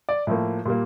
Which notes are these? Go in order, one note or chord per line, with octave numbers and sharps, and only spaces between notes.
D5
A2 F3 A#3
A#2 G3 A#3